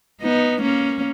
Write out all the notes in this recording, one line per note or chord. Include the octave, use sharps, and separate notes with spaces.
B3 D#4
A#3 C#4